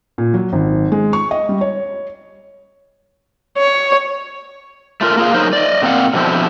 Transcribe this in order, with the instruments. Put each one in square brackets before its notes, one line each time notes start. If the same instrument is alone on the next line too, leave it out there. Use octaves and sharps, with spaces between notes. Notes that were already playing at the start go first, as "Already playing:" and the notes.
[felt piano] A#2
F#3
G#1
G#3
C#6
D#5
G3
C#5
[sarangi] C#5
[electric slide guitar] A3 F4 A#4
A#3 F4 G#4 F5
F#3 D#4 A#4 C5
D5 D#5
A#2 C4 A4 F5 F#5
B2 D3 F3 B3 C4 E4